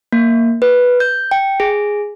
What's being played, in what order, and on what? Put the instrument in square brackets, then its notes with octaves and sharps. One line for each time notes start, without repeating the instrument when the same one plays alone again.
[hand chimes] A#3
B4
G6
G5
G#4